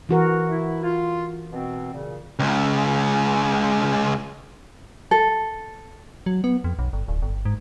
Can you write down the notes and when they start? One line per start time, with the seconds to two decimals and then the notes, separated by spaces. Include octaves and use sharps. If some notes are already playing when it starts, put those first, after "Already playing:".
0.09 E3 F#4 A#4
0.49 E4
0.83 F4
1.52 B2 C4
1.94 A#2 C#3
2.39 C#2 C#3
5.11 A4
6.26 F#3
6.44 B3
6.64 F2
6.79 B1
6.93 G1
7.08 D1
7.22 G1
7.45 G#2